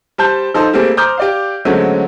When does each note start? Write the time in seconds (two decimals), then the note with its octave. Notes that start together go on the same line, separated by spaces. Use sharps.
0.18 G3 C5 A5 G6
0.54 F3 D#4 A4 C5
0.73 G3 A3 A#3 C4 G#4
0.97 C5 A#5 D6 D#6 F6 G6
1.18 G4 D5 F5
1.65 D3 F#3 G#3 A3 C4 C#4